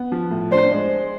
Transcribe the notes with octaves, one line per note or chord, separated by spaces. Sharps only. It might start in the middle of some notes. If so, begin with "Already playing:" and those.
Already playing: B3
F3
A2
D4 C5
G#3